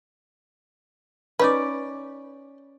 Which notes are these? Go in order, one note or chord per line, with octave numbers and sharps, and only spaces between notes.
C#4 D#4 B4 D5